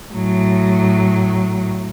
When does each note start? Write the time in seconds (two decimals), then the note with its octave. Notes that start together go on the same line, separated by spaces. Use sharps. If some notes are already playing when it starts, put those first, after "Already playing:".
0.12 A2 F#3